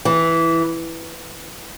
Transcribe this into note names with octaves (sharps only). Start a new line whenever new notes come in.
E3